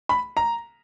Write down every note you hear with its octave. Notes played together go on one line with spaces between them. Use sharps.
B5
A#5